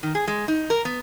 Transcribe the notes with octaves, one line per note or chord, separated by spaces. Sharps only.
D#3
G#4
G#3
D#4
A#4
B3